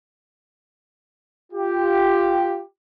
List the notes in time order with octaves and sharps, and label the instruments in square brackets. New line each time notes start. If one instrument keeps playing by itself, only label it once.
[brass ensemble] F4 G4